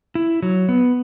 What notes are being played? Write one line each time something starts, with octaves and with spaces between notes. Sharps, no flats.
E4
F#3
B3